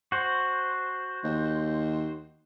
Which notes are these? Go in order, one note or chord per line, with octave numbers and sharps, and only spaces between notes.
F#4 C5
D#2